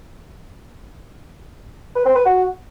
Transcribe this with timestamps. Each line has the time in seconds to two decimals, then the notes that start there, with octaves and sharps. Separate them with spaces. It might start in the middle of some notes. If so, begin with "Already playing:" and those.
1.96 B4
2.06 C4
2.16 B4
2.26 F#4